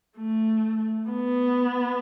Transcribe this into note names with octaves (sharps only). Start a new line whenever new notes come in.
A3
B3